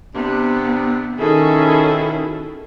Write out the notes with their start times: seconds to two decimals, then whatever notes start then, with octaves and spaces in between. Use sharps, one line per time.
0.15 C3 B3 D4
1.19 B2 D#3 C#4 E4 G#4 A4